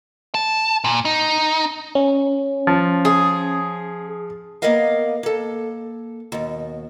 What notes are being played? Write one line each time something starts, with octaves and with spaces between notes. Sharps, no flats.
A5
A#2
D#4
C#4
F3
G#4
A#3 B3 A#4 D#5 F5
A#3 A4
D#2 B2